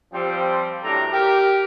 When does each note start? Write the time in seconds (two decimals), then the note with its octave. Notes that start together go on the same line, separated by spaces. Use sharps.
0.12 F3 G3 C4
0.83 F#2 A2 G3 D4 A4 A#5
1.13 G4 A#4